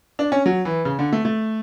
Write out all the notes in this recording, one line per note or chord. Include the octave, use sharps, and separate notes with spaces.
D4
C#4
F#3
E3
C#3
D3
A3
A3